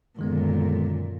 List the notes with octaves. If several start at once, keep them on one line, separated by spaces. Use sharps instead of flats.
F#2 A#2 D3 D#3 G#3 B3